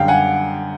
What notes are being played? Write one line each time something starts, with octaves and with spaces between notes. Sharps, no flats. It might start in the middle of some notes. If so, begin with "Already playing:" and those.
Already playing: F#2 D3 G3 F5 G5
F#5 G#5